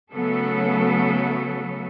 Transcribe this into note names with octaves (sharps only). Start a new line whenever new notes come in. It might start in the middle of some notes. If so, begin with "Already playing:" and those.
C#3 F#3 A3 B3 A4